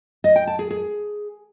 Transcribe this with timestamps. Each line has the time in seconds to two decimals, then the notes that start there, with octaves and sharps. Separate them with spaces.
0.24 D#5
0.36 G5
0.47 A5
0.59 G#4
0.71 G#4